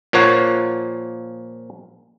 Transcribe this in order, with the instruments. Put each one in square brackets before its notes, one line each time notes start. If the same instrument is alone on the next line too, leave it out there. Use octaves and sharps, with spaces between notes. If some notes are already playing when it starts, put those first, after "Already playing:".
[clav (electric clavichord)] A#2 F3 A#3 C#5 F#5